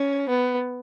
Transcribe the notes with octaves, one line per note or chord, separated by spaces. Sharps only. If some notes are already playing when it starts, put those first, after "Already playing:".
Already playing: C#4
B3